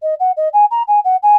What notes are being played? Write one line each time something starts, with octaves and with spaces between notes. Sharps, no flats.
D#5
F#5
D#5
G#5
A#5
G#5
F#5
G#5